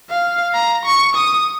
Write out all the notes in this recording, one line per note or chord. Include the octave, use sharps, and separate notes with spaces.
F5
A#5
C#6
D#6